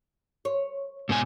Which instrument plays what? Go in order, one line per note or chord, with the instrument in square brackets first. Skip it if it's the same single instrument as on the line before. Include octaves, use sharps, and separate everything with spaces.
[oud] C#5
[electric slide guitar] G#2 B2 G#5